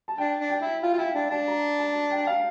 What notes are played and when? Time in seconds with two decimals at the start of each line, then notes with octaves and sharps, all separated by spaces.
0.08 A5
0.18 D4 G5
0.40 D4
0.50 G5
0.62 E4
0.83 F4 F5
0.93 F4
0.98 E4 G5
1.14 D4 G5
1.30 D4 A5
1.47 A#5
1.79 A5
2.11 G5
2.27 F5